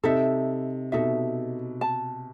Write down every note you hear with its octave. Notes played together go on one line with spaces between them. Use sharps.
C3 D#4 A4 E5
B2 D#4 A4 E5
A5